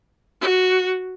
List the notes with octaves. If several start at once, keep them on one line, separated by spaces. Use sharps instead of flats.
F#4